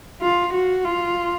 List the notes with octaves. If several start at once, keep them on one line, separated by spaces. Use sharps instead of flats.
F4
F#4
F4